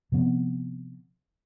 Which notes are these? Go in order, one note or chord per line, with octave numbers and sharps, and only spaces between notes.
C3 F3 B3 C4